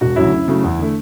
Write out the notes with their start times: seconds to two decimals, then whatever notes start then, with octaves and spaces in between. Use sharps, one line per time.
0.01 E1 F#4
0.16 D2 C#3 F#3 E4
0.32 F#2
0.48 C#3 F#3 A3
0.64 E2
0.79 D3 A3